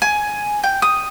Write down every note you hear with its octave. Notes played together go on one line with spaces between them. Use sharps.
G#5
G5
D#6